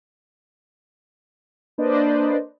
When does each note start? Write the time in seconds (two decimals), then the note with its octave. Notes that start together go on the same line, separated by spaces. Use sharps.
1.78 A#3 D4 B4 C5 D5 D#5